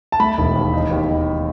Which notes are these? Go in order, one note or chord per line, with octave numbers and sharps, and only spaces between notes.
A5
A3 B5
E1
D#2
D#4
D#2
D#3